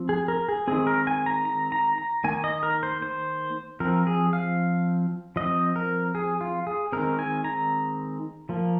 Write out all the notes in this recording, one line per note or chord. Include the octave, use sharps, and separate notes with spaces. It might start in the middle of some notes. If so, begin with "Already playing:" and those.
Already playing: F3 C4
G#4
A#4
G#4
D#3 G#3 C4 G#4
A#4
G#5
A#5
A#5
A#5
A#5
D#3 A#3 G#5
D#5
A#4
C5
C5
F3 C4 A#4
G#4
F5
F3 C4 D#5
A#4
G#4
F4
G#4
D#3 G#3 C4 A#4
G#5
A#5
F3 A#3